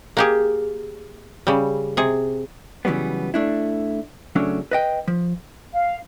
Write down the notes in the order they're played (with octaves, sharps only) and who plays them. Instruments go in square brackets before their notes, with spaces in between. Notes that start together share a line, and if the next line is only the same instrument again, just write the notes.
[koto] A#3 G4 G#4
C#3 G3
C3 G#4
[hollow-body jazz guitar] C#3 E3 F#3 G3 B3
A3 D4 E4
C#3 F#3 A3 C#4 D4
B4 D#5 G5
F3
[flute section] F5